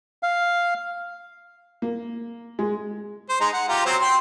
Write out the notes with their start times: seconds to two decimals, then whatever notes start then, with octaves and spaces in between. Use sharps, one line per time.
0.23 F5
1.82 A#3
2.59 G#3
3.29 C5
3.41 G#3 D#4
3.53 F#5
3.68 F4 G4 A#5
3.86 F#3 C4 C5
4.01 G5 C6